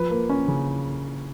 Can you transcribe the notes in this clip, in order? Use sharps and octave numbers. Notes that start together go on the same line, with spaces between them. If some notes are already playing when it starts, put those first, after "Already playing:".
Already playing: F3 B4
A#3
C#4
C#3